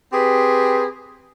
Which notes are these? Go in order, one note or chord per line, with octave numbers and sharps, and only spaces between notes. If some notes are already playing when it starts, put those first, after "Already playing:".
C4 G4 G#4 B4